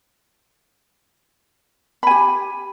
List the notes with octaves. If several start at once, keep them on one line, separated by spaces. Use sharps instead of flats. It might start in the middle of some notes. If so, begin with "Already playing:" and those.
G4 G#5 B5